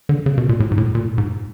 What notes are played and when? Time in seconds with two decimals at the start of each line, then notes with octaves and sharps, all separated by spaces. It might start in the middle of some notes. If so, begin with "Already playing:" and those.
0.09 D3
0.26 C#3
0.38 B2
0.49 A#2
0.60 A2
0.71 G#2
0.78 A2
0.95 A#2
1.02 A2
1.07 A#2
1.18 G#2